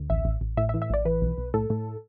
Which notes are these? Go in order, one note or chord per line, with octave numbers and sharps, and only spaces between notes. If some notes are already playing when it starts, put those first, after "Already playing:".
Already playing: D2
A1 E5
A1
A1
A2 E5
E5
E3
E5
A1 D5
E3 B4
B1
B1
A2 A4
A2